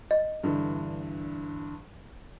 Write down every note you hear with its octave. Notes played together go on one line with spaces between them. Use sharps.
D#5
G2 D3 E3